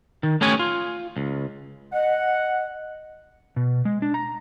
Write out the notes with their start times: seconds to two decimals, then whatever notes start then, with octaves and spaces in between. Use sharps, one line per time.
0.23 D#3
0.41 A3 B3 C#4 G4 C#5 G#5
0.59 F4
1.17 C#2
1.92 D#5 F#5
3.56 B2
3.85 G#3
4.02 D4
4.14 A#5